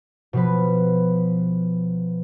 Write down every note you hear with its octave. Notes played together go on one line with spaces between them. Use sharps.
B2 F3 B4